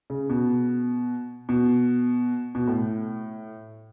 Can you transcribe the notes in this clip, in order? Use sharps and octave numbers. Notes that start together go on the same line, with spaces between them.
C#3
B2
B2
B2
A2